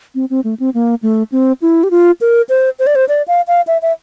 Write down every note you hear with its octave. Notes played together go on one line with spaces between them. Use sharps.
C4
C4
A3
C4
A#3
A3
C4
E4
G4
F4
A#4
C5
C5
D5
C5
D5
F5
F5
E5
E5